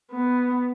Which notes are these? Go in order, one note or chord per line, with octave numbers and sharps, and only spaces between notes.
B3